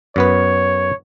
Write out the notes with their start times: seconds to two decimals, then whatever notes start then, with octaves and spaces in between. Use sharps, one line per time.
0.16 F#2 B3 B4 C#5